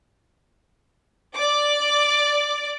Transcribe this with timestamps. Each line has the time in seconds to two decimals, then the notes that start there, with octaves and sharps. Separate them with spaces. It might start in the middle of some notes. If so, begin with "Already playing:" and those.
1.34 D5 D6